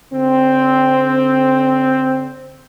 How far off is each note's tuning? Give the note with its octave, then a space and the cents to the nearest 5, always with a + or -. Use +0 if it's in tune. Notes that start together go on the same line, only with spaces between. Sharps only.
D3 -35 C4 +0